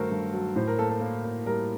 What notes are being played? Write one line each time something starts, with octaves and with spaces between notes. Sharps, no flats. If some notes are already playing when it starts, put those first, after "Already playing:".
Already playing: G2 D#3 F#3 A3 F#4 A4 A#4 C5
G2
F#3
A2 C5
A#4
A#3 A4
A4
A#3
A#3
G3 A#4